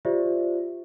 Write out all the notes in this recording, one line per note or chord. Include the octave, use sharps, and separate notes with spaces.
F4 G4 C5 D5 E5